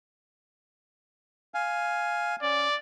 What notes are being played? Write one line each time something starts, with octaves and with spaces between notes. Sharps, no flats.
F5 G#5
C#4 D5